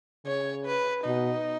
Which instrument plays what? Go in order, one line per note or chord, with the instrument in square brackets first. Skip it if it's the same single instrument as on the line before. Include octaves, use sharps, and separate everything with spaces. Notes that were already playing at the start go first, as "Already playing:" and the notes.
[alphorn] C#3 [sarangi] C#5
[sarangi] B4
[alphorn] B2 [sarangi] D#4